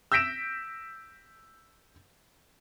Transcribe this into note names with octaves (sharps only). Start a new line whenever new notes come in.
E6 G6 A#6 B6 D7 E7